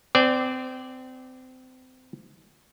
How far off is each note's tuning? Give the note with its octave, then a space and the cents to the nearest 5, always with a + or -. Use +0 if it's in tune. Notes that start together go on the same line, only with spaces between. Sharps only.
C4 -30 D5 +0 G#5 +0